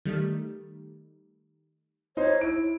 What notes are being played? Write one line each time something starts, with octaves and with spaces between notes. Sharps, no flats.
D#3 G3 A3
D#4 C5 C#5
E4 D7